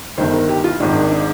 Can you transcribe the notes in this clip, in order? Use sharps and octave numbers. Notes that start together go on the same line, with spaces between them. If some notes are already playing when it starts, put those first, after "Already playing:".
G1 G2 D#3 C5
A#4
G4
F4
G#1 G#2 D#3 D4
D4
D4